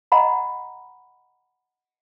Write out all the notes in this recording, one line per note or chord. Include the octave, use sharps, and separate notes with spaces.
D#5 F#5 A#5 B5